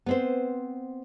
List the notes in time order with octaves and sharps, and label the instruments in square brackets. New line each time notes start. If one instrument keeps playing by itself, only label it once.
[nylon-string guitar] B3 C4 C5